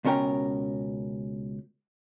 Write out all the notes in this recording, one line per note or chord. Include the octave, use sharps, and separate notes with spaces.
C#2 B2 C#4 A#4 G5